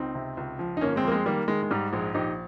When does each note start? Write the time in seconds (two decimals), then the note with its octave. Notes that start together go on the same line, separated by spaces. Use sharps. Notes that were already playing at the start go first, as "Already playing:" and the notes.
Already playing: C#2 C4 D#4
0.15 C3
0.37 C#2
0.59 F3
0.77 D#4
0.81 G1 A#3 C#4
0.96 G#3 C4
1.04 F2 A#3
1.12 G#3 C4
1.26 D#3 G3 A#3
1.48 D#3 G#3
1.63 G#3
1.71 G#2 G3
1.93 A#1 G#3
2.14 A#1 D#4 G4